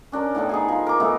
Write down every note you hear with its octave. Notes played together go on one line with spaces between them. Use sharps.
C#4 D4 A#4
A2 D#3 B3 D4
D#4 G#4 G#5
F3 A#5
A#4 D6
E3 A3 B3 D#4